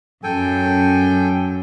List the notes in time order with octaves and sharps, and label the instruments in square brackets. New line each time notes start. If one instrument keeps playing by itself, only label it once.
[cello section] F#2 [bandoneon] A4 G5 G#5